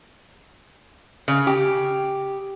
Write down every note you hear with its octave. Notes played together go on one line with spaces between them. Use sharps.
C#3
G4